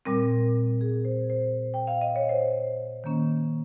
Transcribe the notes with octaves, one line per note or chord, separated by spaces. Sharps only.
A#2 G3 C4 A#4
G#4
C5
C5
G5
F5
D#5
C#5
C5
D#3 A#3 C#4